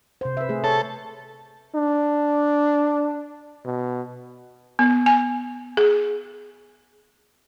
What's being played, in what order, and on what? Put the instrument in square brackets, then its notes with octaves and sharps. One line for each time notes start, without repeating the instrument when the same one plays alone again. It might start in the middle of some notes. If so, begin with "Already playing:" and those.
[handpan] C3 C5
B4 E5
A3 G#4
[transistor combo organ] A4 [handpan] C#5
[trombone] D4
B2
[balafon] B3
G#5
G#4